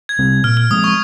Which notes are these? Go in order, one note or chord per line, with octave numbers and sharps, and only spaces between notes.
G#6
C3 G3 C4
A#2 F6
F6
F3 G#3 C4 D#6
C#6